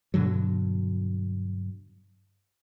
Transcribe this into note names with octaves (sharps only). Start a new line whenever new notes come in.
G2 B2 D3 F#3